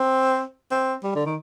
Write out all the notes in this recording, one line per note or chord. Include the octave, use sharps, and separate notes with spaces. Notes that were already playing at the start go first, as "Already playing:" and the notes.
Already playing: C4
C4
G3
D3
D#3